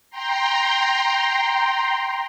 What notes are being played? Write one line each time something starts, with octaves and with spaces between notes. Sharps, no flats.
G5 A#5 C6